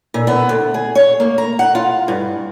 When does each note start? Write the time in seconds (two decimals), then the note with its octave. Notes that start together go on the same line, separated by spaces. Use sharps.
0.14 A#2
0.27 B3
0.49 D2
0.74 G#4
0.95 C#5
1.20 A#3
1.38 A#5
1.59 F#5
1.75 F4
2.08 G2